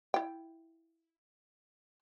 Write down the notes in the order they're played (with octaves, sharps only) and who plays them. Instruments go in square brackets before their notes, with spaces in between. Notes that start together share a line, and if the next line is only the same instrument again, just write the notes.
[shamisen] E4 G5